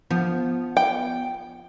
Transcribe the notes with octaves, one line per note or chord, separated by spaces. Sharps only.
F3 B3
G5